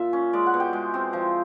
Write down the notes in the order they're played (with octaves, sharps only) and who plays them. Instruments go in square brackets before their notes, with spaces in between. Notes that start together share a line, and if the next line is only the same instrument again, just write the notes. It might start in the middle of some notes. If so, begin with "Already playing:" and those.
Already playing: [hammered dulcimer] A#2 E5
C#4
G#3 D5
F#5
B2
G5
G#3
C4
F3